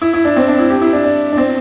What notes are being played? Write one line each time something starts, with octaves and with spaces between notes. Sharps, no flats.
E4
E4
D4
C4
D4
E4
G4
E4
D4
D4
D4
C4